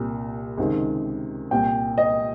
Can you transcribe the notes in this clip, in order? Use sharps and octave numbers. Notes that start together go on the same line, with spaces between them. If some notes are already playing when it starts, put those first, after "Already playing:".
Already playing: C2 A#2
C#2 C3 D#3
C2 A#2 G5
D#5